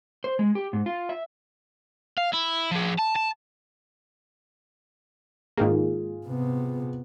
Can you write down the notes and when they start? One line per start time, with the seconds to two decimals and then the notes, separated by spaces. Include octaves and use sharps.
0.24 C5
0.39 G#3
0.55 G4
0.73 G#2
0.86 F4
1.09 E5
2.18 F5
2.34 E4
2.71 F3 G#4
2.99 A5
3.16 A5
5.57 G#2 D#3 A#3 F4 G#4
6.27 C3 B3